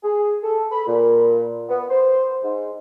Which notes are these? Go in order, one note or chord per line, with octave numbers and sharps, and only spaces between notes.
G#4
A4
B5
A#2
B3
C5
G#2